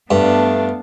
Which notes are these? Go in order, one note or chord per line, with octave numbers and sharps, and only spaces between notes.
G2 A3 B3 D4 F5